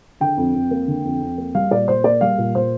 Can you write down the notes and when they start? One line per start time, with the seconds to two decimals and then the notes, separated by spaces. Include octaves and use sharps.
0.20 D3 G5
0.37 F2
0.55 F2
0.71 A#3
0.87 D3
1.04 F2
1.21 F2
1.38 A#3
1.55 G3 F5
1.71 A#2 D5
1.88 A#2 C5
2.04 A#3 D5
2.21 G3 F5
2.38 A#2
2.55 A#2 C5